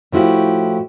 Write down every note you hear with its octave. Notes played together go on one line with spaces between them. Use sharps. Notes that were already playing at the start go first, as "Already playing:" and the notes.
A2 F3 E4 F#4 G4